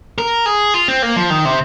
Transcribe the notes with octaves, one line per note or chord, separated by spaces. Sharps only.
A#4
G#4
F4
C4
A#3
F3
D#3
C3